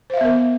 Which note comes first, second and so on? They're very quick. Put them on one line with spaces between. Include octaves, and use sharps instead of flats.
C5 F5 E5 B3 A#4